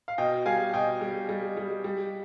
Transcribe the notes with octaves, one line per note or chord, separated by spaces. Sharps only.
F5
B2 D#5 G5
G3 F5 G#5
B2 D#5 G5
G3
G3
G3
G3